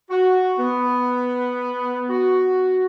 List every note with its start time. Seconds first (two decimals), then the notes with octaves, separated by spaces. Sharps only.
0.10 F#4
0.59 B3
2.10 F#4